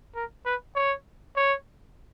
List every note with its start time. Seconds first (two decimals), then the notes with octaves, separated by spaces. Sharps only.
0.15 A#4
0.46 B4
0.76 C#5
1.37 C#5